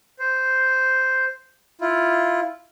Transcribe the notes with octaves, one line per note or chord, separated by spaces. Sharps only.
C5
E4 F4